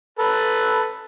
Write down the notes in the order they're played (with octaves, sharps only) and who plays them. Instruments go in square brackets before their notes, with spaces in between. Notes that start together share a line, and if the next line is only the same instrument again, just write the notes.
[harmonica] A4 B4